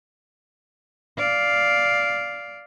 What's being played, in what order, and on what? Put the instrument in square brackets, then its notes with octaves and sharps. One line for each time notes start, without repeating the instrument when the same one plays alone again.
[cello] D5 F5